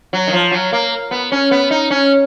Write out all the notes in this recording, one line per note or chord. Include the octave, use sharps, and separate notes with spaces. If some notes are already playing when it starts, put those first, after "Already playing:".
F#3
D#3
F3
F#3
A#3
B3
C#4
B3
D#4
C#4